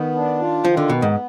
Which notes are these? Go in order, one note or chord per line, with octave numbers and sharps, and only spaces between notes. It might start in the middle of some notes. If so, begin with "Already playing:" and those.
Already playing: D#3 B3
D4
F4
D#3 F3
D3
B2 B3
G#2